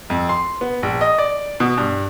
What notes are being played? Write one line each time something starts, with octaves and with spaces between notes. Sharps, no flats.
F2
C6
B3
A#1
D#5
D5
B2
G2